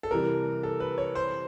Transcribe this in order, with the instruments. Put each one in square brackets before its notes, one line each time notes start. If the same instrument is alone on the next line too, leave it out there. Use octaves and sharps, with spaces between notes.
[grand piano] A4
[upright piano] C3 E3 G3 [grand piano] A#4
[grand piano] A4
B4
C#5
C5